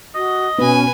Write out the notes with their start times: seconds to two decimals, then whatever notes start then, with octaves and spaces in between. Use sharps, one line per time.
0.15 F#4 D#5
0.58 B2 B3 C#4 B4 G#5